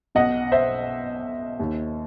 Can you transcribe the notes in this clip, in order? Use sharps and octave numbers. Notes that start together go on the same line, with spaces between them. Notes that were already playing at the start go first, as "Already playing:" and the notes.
B1 B2 D#5 F#5
C5 E5
D#2 D#3